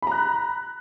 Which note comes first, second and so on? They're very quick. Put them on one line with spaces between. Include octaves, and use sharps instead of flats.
B5 A#5 F#6